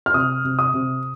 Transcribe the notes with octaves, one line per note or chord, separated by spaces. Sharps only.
F6
C3 D#6
C3
D#6
C3